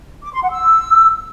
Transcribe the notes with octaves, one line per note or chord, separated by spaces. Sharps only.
D6
C6
F#5
E6